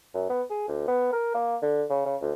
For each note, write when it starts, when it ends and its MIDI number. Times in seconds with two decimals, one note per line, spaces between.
0.14 0.28 42
0.30 0.42 59
0.50 0.67 68
0.68 0.84 38
0.88 1.11 59
1.13 1.34 70
1.34 1.57 58
1.62 1.85 50
1.90 2.04 49
2.06 2.17 49
2.22 2.33 38